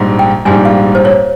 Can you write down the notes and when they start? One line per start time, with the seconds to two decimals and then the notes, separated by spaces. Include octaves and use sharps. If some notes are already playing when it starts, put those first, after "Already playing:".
Already playing: A#1 G#2 G3
0.19 G5
0.45 A#1 G#2 G3 G#5
0.65 F5
0.95 C5
1.05 C#5